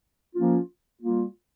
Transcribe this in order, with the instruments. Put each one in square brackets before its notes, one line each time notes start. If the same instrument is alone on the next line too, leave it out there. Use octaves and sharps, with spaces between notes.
[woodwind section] F3 A#3 C#4 F4
G3 A#3 F4